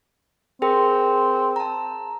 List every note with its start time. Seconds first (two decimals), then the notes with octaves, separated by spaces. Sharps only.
0.62 C4 G#4 A#4 G5
1.56 A5 A#5